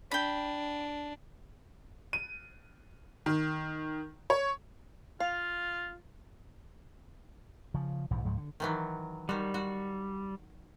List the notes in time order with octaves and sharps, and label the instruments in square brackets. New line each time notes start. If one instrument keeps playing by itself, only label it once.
[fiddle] D4 [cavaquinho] G5 B5
[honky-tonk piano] D#7
D#3
C#5
[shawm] F4 [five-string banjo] F5
[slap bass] C#3 F3
A#1 G#2 E3 F3
C#2 G#2 F3 F#3
D3
[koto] D#3 E3 F#3
[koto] D#3 F#4 [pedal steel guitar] G3
[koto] F#4